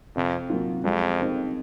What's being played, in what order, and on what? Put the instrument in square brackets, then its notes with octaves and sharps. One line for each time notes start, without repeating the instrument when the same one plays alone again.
[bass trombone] F2 [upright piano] C3
[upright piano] F#3 A#3 F4
[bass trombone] F2 [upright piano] G#3
[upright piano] C4 D#4 A#4